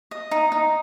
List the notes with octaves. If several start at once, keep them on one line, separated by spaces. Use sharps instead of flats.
D#5
D#4
D#4